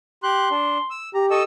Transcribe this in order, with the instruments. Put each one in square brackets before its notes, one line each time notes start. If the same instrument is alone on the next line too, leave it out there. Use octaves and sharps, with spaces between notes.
[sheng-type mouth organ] G4 F#6 [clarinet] C6
[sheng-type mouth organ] D4
E6
[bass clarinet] G4 [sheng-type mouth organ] A#5
[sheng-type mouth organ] A4 D#5 E6 [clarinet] C#6